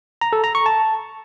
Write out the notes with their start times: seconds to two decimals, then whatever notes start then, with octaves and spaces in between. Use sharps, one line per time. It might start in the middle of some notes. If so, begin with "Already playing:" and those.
0.21 A#5
0.33 A4
0.44 A#5
0.55 C#6
0.66 A5